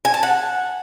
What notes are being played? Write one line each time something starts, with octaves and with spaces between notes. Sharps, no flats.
G#5
A5
F#5